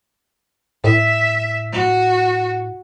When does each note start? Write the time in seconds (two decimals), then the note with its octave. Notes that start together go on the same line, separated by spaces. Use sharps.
0.84 A2 E5
1.72 F#4